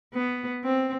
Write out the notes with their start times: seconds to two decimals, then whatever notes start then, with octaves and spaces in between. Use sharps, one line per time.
0.14 B3
0.63 C4